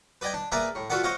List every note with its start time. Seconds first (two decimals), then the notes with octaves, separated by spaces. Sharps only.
0.21 B4 D5 D#5 G5 G#5
0.34 D4
0.52 A#3 G#4 A#4 B4 D5 E5
0.75 A2
0.90 F4 F#4 A4 B4 D5 F#5
1.03 C5 C#5 D#5 F5 F#5